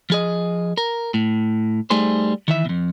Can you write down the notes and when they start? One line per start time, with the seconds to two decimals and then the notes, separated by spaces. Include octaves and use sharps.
0.10 F3 G#4 D#5
0.77 A#4
1.14 A2
1.90 G3 A3 D#4 G#4 C5
2.48 D#3 E3 E5
2.65 F2 B2